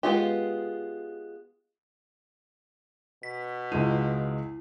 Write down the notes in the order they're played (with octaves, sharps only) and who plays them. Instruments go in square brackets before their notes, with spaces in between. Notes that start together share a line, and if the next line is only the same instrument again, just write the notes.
[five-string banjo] G#3 B3 F4 G4
[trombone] B2 [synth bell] B6
[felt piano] C#2 G#3 D#7 [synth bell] E4